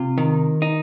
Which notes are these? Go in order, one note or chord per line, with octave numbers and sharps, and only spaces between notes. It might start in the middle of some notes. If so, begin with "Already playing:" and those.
Already playing: C3 F4
D#3
D#4